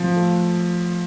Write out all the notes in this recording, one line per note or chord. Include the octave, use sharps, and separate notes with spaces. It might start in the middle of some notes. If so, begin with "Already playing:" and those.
Already playing: F3
A3